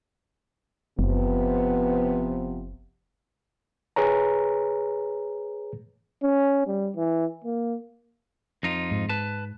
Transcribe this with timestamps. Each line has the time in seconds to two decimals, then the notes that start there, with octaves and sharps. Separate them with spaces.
0.99 F#1 C3 F3 B3
3.96 G#4 B4 C#5 A#5
6.23 C#4
6.67 G3
6.96 E3
7.44 A#3
8.63 F2 D#4 F4
8.91 G#2
9.09 B4 A5